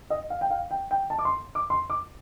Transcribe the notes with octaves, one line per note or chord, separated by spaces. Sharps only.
D#5
F5
G5
F5
G5
G5
A5
D6
C6
D6
C6
D6